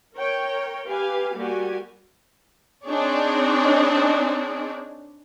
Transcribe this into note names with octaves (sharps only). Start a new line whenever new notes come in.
A#4 C#5 G5
G4 B4 F5 G#5
G3 A#3 F#4 G4 G#5
C4 D4 D#4 G#4 C#5 D5